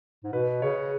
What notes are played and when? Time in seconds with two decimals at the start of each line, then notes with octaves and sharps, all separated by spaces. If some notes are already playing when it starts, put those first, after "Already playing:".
0.24 G#2
0.32 B2 B4
0.62 C#3 C#5